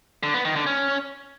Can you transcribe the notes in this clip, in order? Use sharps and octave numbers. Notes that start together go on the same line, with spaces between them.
D3
B3
D#3
D3
C#4